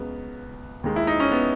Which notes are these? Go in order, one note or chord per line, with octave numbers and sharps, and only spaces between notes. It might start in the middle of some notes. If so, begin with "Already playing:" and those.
Already playing: C#2 C#3 F#3 B3
D#2 D#3 G#3
E4
D#4
C#4
B3